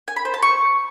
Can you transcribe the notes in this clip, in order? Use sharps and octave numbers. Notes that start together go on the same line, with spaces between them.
G#5
B5
C5
A5
C#6